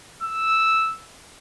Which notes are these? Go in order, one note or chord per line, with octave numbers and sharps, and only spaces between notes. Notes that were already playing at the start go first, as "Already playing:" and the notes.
E6